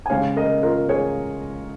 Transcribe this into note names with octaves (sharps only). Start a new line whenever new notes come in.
G#5
C#3 G#3 C#4 C#5 F5
A#4 D#5
F4 A#4
G#4 C#5